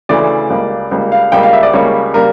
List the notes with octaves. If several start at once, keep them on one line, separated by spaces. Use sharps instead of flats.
D2 C#3 E3 A3 D5
C#2 C#3 G3 A#3
C#2 C#3 G3 A#3
F5
C#2 C#3 G3 A#3 G5
F5
E5
D5
C#2 C#3 G3 A#3 C#5
C#3 G3 A#3 A#4